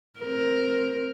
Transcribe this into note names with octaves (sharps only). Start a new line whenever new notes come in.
C4 A#4